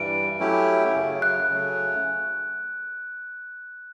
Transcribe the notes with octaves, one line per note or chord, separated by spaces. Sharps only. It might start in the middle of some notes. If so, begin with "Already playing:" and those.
Already playing: G2 E3 G3 D7
F#3 A3 C#4 E4 G4
F#2 C#3 F#3
F#6
C#3 F#3 A3 C#4